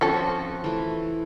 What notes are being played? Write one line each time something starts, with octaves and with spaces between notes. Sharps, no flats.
F3 C4 C#4 F#4 A4
E3 A3